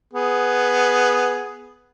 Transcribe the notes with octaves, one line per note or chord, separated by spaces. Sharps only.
B3 G#4